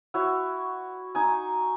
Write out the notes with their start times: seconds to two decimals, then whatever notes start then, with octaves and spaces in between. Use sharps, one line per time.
0.14 E4 F#4 C#5
1.15 D#4 G#5